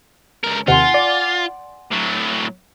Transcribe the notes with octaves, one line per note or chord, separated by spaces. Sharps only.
C#2 A#4
D#2 C3 D#3 F4 F#5 G#5 C6
D5
A2 F#3